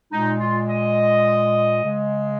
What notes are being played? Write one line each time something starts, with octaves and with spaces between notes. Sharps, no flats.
A#2 G#3 D#4
F4
D#5
C#3 G#3